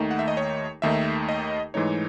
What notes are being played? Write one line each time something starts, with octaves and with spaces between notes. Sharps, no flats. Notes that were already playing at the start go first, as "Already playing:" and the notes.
Already playing: D#2 D#3 A3 D#4
F#5
E5
D#5
C#5
D#2 D#3 A3 D#4 E5
D#5
G#2 E3 A3 D#4 C#5